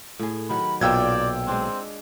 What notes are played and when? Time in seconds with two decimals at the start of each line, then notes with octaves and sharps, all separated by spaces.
0.19 A2 G#4
0.50 D#3 F#3 A#4 B5
0.81 B1 A#2 F4 D5 G5 E6 G#6
1.48 G#3 C4 D4